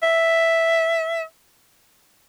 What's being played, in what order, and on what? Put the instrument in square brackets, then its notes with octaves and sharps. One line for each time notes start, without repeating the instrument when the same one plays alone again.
[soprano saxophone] E5